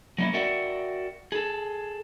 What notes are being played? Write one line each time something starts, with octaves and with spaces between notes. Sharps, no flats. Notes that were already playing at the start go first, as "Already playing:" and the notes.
F#3 A#3 C#4 E4
F#4 A#4 D5 E5 F#5 G5
G#4 A4